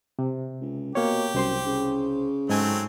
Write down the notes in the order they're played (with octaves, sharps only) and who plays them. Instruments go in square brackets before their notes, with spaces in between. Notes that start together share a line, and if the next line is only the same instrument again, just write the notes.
[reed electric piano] C3
[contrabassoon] C#2
[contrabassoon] B2 [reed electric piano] A#3 C#5 [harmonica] G4
[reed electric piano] C2 C5 C6 [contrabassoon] F#2
[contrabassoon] C#3
[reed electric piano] G#2 G#5 [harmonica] F#3 A3 C4